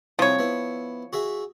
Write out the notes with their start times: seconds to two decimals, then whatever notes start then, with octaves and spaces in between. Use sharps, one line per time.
0.19 C2 F3 E4 C#5 G5
0.39 B3 E4
1.13 F#4 G#4 E5